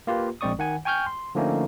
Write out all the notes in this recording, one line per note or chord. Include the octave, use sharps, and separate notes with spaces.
A#3 F4 G4 B4
A#1 G#3 C4 D5 C#6 D#6
D#3 F#5 G#5
G5 G#5 C#6 F6 G6
C6
D3 F3 A3 A#3 C#4 D#4